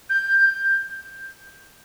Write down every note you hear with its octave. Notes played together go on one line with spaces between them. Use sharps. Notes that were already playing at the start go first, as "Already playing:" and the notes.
G6